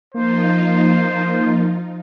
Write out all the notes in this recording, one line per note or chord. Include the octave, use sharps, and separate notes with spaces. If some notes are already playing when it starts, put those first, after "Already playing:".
F3 A#3 D#4 F4 C5